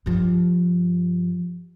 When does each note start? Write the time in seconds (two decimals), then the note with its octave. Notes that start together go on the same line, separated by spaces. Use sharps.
0.06 G2 F3